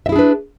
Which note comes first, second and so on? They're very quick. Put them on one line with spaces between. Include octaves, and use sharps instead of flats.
E5 E4 G#4 D4 B4